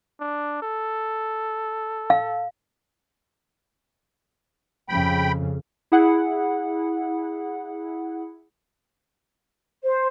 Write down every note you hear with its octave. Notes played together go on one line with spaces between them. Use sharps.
D4
A4
F5
F2 C#3 G5 B5
E4 G#4 F#5
C5